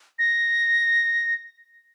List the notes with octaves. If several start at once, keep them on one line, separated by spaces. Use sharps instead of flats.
A#6